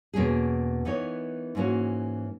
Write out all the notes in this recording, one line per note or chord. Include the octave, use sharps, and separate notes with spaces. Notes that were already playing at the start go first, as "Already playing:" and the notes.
E2 B2 A#3 C#4 G#4
E3 B3 D#4 A#4 C#5
G#2 E3 A#3 C#4 F#4